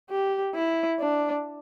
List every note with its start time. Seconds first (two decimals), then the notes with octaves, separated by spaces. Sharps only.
0.10 G4
0.55 E4
1.00 D4